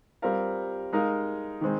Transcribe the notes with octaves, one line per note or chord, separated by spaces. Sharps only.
G3 C4 F4 A#4 F5
G#3 D#4 A#4 F5
D#3 G#3 C4